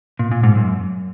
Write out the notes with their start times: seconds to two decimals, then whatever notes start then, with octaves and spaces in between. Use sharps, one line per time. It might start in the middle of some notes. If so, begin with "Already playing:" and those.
0.19 A#2
0.31 A#2
0.43 G#2
0.55 F#2